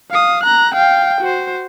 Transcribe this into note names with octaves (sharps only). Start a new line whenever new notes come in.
F5 D#6
A#5 F#6
F5 G5
F#4 C5